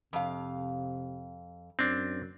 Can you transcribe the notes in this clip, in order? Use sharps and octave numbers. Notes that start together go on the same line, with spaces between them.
F2 C3 F5
F#2 C4 D4